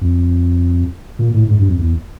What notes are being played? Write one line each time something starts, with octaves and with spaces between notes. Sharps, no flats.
F2
A#2
A2
G#2
G2
F2
E2